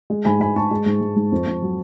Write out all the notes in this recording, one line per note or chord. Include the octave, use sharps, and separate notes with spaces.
G#3
G#2 G#5 B5
G#3 G#5 B5
G#3 A5 C#6
G#3
G#2
G#2
G#2
F2
F2
F#3